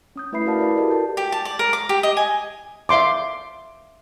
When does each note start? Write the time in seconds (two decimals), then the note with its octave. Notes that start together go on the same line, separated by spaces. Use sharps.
0.16 C#4 D#6 G6
0.32 A3 E4 B4 E5 B5 C7
0.46 E4 F#4 A#4 D5 F5 A5
0.59 E4 A#4 B4 D5 A5
0.76 F#4 G4 A4 A#4 D5 D#5
0.90 A5 G6
1.17 G4
1.32 A5
1.45 D5
1.59 A#4
1.73 D6
1.89 G4
2.03 D#5
2.17 G#5
2.89 E5 F5 C6 D6